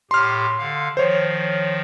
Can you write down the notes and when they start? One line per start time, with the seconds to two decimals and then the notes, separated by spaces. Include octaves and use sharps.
0.11 A2 G4 C6 F6
0.58 D3 F5
0.97 D#3 F3 C5 C#5